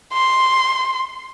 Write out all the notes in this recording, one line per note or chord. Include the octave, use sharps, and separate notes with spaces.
C6